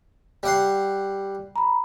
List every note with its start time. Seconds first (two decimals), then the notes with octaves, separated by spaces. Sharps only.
0.43 G3 F#5 C6
1.56 A#5 B5